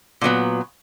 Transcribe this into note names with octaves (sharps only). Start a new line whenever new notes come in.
A#2 F#3 B3